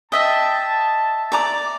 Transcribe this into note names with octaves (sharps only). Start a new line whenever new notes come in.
D#5 E5 G5 A5 D#6
D5 A#5 D6